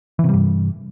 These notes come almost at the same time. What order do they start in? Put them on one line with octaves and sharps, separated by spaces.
E3 C3 G3 G2